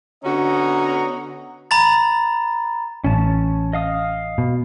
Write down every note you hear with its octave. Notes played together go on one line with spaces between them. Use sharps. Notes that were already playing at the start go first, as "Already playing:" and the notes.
D3 B3 C#4 F#4 D#5 A#5
A#5 B5 A6
A1 C#4 A5
D#5 F5 D#6
B2